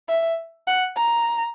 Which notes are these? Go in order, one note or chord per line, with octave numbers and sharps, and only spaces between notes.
E5
F#5
A#5